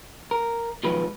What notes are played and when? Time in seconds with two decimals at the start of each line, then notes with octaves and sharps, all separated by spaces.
0.31 A#4
0.83 B2 D#3 F3 F#3 G#3 B4